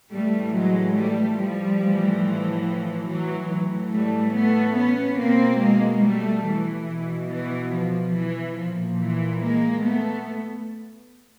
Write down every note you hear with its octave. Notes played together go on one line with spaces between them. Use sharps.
A2 E3 G3 A3
F#3 G#3
G3 A3
F3 G3
A2 E3
F3
E3 F#3
A2 E3
G3 A3
A3 B3
B3 C#4
B2 A#3 C4
G#3 A#3
G3 A3
E3
B2
E3
F3
E3
A#2 F3
E3
G#3 A#3
A3 B3